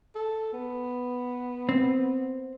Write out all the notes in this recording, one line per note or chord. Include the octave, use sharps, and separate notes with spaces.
A4
B3
C4